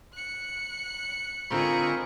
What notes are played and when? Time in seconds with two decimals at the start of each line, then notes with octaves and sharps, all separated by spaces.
0.14 F#6 C#7
1.50 D3 C4 D#4 F4 G#4 A#4 B5 C#6